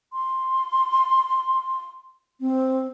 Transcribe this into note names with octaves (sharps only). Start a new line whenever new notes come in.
C6
C4